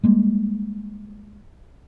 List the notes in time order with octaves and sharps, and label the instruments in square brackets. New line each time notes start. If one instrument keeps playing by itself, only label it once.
[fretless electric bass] G3 G#3 A#3